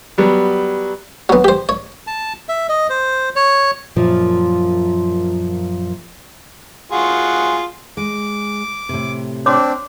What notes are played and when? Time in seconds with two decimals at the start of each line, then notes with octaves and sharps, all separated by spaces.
0.18 F#3 G3 B3
1.29 F#3 B3
1.44 G4 C5
1.69 C#5
2.07 A5
2.49 E5
2.69 D#5
2.90 C5
3.36 C#5
3.96 F#2 A#2 F3
6.92 F4 F#4 G#4
7.97 G#3 D6
8.89 A2 C3
9.46 C4 D4 C#5 C6 D6